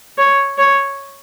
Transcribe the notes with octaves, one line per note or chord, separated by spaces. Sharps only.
C#5
C#5